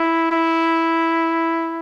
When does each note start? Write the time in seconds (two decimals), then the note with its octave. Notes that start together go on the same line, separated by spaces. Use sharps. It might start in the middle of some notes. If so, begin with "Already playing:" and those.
Already playing: E4
0.31 E4